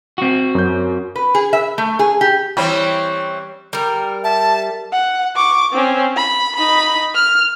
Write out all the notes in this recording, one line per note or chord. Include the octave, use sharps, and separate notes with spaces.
C4 F#4
F#2 G6
B4
G#4
E5
A3
G#4
G4
E3 G3 C4 C#4
G3 A#4
E5 A5
F#5
C#6 D6
C4 C#4
B5
D#4 B5
F6